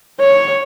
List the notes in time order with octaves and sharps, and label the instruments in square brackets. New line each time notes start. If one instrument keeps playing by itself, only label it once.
[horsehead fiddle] C#5